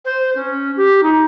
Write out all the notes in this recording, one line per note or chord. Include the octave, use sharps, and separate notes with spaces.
C5
C#4
G4
D#4